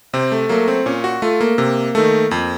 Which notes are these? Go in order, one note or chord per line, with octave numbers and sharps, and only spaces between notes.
C3 C4
A3
F#3 A3 A#3
C4
A#2 C#4
F#4
A3 F4
A#3
C3
D#3 A3
F2